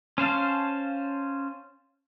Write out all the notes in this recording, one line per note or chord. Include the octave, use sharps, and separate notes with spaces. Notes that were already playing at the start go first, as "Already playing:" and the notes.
C#4 C5 F5 A5